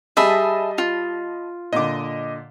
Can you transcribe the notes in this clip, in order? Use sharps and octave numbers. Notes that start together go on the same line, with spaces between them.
G3 G#4 D#5 E5 A5 B5
F4
A#2 D3 D#5 D6